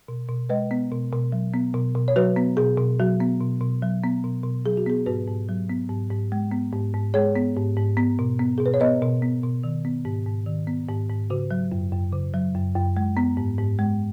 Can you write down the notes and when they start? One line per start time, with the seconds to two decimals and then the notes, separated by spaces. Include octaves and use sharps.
0.08 B2
0.28 B2
0.49 G#3 B4 D#5
0.71 B3
0.92 B2
1.13 B2
1.32 F#3
1.54 B3
1.74 B2
1.95 B2
2.08 C#5
2.16 F#3 F#4 B4
2.36 B3
2.57 B2 G#4
2.78 B2
3.00 F#3 F#4
3.20 B3
3.41 B2
3.61 B2
3.82 F#3
4.03 B3
4.24 B2
4.44 B2
4.66 F#3 G#4
4.77 F#4
4.87 B3 G#4
5.06 G#2 F#4 B4
5.28 G#2
5.49 F#3
5.69 B3
5.89 G#2
6.11 G#2
6.32 G#3
6.52 B3
6.73 G#2
6.94 G#2
7.14 G#3 G#4 C#5
7.36 B3
7.56 G#2
7.77 G#2
7.97 B3
8.19 B2
8.39 B3
8.58 B2 G#4
8.66 B4
8.74 C#5
8.80 B3 B4 D#5
9.02 B2
9.22 B3
9.44 B2
9.64 D#3
9.85 B3
10.05 G#2
10.26 G#2
10.47 D#3
10.67 B3
10.89 G#2
11.10 G#2
11.30 C#3 F#4
11.51 F#3
11.72 F#2
11.92 F#2
12.13 C#3
12.34 F#3
12.55 F#2
12.76 F#2
12.97 G#3
13.17 B3
13.37 G#2
13.59 G#2
13.79 G#3